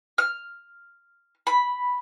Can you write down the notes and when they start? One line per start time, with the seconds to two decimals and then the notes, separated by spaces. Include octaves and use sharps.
0.18 F6
1.47 B5